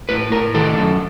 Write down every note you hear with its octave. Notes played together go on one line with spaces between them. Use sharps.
A2 B4
A2 A#4
D#3 A4
F#2